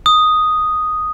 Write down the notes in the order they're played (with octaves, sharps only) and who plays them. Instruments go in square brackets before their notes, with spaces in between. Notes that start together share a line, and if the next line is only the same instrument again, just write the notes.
[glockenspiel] D#6